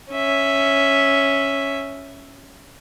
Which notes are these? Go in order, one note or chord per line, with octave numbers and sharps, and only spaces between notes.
C#4 E5